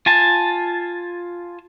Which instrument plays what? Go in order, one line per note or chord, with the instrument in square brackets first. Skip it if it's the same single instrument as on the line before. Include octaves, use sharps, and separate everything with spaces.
[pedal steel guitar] F4 G#5 A5